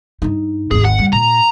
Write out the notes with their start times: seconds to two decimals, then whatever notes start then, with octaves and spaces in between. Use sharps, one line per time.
0.22 G2 D#4
0.71 G#1 D#2 G#4
0.85 F#5
0.98 F#2 G3
1.13 A#2 A#5